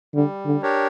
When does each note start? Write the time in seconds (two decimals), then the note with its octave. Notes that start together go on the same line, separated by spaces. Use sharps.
0.14 D3 G3
0.46 D3
0.62 D4 G4 A#4 C#5